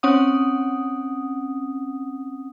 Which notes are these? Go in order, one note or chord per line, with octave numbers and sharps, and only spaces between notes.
C4 C#4 F#5 D#6